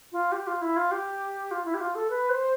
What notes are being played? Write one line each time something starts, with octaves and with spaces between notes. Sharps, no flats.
F4
G4
F4
E4
F4
G4
F4
E4
G4
F4
A4
B4
C5